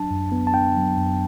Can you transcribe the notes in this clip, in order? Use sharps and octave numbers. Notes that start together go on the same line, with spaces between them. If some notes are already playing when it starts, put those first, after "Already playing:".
Already playing: F#3 D4 A5
F#2
B3
A5
D4 G5
F#3
F#2